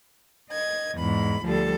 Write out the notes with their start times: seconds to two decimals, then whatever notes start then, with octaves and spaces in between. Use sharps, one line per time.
0.50 D#5 G#6
0.96 E2 G#2 B5
1.44 D2 F3 G3 A4